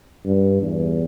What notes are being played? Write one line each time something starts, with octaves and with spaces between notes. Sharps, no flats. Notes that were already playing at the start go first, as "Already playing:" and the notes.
G2
E2